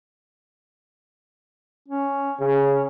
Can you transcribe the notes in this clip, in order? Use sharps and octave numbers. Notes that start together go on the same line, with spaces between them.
C#4
C#3 C#4